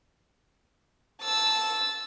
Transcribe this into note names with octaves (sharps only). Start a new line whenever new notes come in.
A5 E6